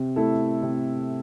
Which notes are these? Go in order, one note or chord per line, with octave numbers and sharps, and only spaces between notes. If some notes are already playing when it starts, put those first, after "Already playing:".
Already playing: C3
A3 E4 A4
C3